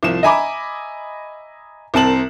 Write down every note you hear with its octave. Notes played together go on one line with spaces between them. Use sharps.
C2 F3 E7
D#5 E5 G#5 A#5 B5 D6
C2 C4 A#4 A5 E7 F#7